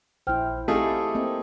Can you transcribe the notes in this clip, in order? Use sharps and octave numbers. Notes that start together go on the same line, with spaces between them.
A#1 E4 C5 G5 F6
A3 C4 D#4 E4 G4 G#4 F5 A5
A#3 C4 D#5